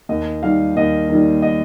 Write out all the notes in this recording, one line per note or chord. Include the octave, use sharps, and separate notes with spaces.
D#2 D#5
D#3 G3 F5
D#2 D#5
D#3 G3
D#5